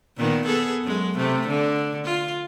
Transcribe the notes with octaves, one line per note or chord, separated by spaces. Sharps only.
A#2 D#3 B3
B3 G#4 A4
F#2 G#3
C3 A3
D3
F4